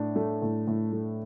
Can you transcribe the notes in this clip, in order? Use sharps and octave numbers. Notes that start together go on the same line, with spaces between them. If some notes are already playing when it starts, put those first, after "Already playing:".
Already playing: A2 D4
A3
A2
A2
A3